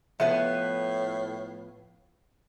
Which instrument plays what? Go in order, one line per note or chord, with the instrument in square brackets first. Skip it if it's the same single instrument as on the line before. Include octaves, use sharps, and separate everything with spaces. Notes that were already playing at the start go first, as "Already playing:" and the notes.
[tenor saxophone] A2 [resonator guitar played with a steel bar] F3 B3 B4 [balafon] E5